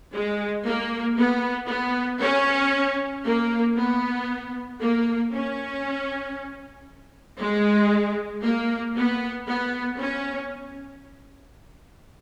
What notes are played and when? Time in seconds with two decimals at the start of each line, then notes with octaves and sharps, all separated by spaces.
0.13 G#3
0.65 A#3
1.17 B3
1.69 B3
2.21 C#4
3.24 A#3
3.77 B3
4.80 A#3
5.32 C#4
7.39 G#3
8.44 A#3
8.95 B3
9.47 B3
9.99 C#4